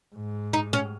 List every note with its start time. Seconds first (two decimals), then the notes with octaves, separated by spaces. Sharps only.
0.15 G#2
0.53 D#4
0.73 C#4